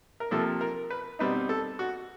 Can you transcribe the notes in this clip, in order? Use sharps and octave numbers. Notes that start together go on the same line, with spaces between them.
A#4
C3 F3 A#3 A4
A#4
B4
B2 G3 C4 D#4 B4
A4
F#4